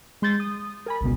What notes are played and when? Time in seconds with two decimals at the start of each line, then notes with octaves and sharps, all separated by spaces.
0.22 G#3 C6 G6 A6
0.40 D#6
0.86 A#4 G#5 B5
1.01 G#1 C#2 B2